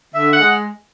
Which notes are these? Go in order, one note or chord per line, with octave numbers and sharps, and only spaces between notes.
D3 E5
F#5
G#3